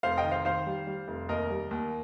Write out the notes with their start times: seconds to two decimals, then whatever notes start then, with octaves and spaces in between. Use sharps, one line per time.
0.03 F1 C5 F5
0.17 D#5 G5
0.24 D#3
0.31 C5 F5
0.45 D#3 C5 F5
0.67 G3
0.87 G3
1.08 F1
1.29 D#2 A#4 D#5
1.50 G3
1.71 D#2